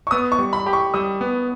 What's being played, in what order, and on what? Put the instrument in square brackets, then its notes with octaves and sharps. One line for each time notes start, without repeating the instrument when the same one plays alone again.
[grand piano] C#6
[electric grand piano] B3 [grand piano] D#6
[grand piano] C#6
[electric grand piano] G3
[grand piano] B5
[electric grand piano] G4 [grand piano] B5
[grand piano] C#6
[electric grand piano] G3 [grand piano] D#6
[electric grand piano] B3